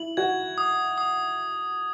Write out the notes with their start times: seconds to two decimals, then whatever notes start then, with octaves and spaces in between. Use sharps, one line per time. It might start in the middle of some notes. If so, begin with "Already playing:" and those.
Already playing: E4 F#7
0.17 F#4 G#6
0.58 D#6
0.98 D#6